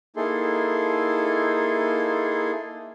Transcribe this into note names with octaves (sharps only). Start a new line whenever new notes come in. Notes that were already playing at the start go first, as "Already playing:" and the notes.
A#3 D#4 E4 G#4 A4 C6